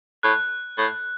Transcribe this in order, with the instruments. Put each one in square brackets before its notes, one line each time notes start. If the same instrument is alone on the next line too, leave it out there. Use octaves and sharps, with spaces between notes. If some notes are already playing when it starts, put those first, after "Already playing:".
[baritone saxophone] A2 [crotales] F#6
[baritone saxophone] A2